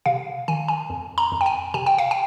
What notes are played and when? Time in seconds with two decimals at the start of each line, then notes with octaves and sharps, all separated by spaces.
0.06 C3 F5
0.48 D#3 G#5
0.68 G#5
0.90 F2
1.18 A#5
1.32 F2
1.41 G5
1.46 G#5
1.74 C3 G#5
1.86 G5
1.98 F5
2.11 G5